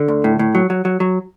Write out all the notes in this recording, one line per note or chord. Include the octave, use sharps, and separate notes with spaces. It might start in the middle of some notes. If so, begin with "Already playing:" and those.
Already playing: D3
D2
A2
A2
F#3
F#3
F#3
F#3